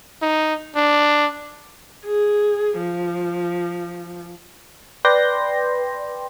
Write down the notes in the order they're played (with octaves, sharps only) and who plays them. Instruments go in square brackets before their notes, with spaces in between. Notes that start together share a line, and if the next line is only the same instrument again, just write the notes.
[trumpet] D#4
D4
[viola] G#4
F3
[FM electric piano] B4 D5 G5 C6 G6 A#6